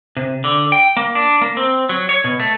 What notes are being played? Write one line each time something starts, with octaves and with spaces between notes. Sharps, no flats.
C3
D3
G5
A#3
D4
A#3
C4
F#3
C#5
B2
A3